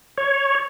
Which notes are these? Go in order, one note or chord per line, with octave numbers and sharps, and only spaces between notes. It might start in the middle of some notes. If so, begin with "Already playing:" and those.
C#5